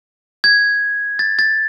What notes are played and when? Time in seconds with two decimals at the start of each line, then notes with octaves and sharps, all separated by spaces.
0.44 G#6
1.19 A6
1.39 A6